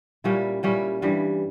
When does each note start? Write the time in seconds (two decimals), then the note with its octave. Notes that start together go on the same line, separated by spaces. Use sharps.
0.24 A#2 G3 C#4 E4
0.63 A#2 G3 C#4 E4
1.02 G2 E3 G3